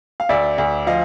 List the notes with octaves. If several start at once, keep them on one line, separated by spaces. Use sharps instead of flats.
F5
D2 D5 E5
D2
F3 D#5 F5